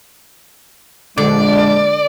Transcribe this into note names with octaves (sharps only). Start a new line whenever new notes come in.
A#1 D3 G#3 D4 D5